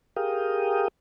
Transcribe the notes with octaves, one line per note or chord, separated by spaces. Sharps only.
G4 G#4 A#4 F5 G5 D#6